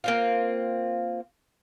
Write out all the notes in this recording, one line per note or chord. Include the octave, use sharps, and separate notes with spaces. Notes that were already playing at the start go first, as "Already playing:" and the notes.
A#3 C4 F4